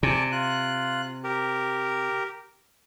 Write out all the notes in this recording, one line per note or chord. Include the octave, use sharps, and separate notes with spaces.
C3 D5 G#5 A5
F4 F#6
G4 A#4